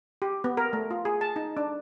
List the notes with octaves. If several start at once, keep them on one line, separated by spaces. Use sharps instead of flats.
G4
B3
A#4
A3
F4
G#4
A5
D#4
D4